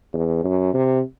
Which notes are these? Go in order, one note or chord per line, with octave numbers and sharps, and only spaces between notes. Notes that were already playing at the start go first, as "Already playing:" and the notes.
E2
F#2
C3